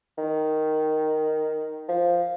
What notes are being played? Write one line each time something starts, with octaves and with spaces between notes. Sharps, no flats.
D#3
F3